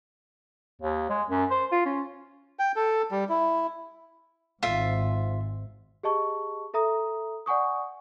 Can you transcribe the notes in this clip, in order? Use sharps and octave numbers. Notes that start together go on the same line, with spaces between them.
D#2
G#3
F#2
C5
F4
C#4
G5
A4
G3
E4
G#1 G#2 F4 E5
G4 G#4 D#5 A5 C#6
A4 E5 A#5 D#6
D5 F#5 G#5 C#6 D#6